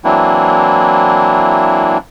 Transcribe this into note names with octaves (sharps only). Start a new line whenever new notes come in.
E3 F#3 A#3 C4 D4 E4